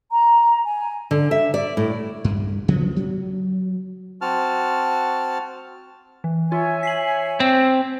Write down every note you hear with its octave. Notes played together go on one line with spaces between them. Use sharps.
A#5
G#5
D3
E5
D5
A2
G2
C#3 F3 F#3 B3
F#3
C4 F#4 A5 F6
E3
F4 C#5 E5 G#5
B6 C7 F#7
C4